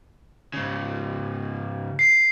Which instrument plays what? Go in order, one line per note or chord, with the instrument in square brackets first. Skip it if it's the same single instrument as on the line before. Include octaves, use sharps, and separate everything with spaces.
[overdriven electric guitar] G#2 C#3
[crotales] C7